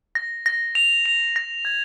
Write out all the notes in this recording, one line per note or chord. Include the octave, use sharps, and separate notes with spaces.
A#6
A#6
F7
F7
A#6
G#6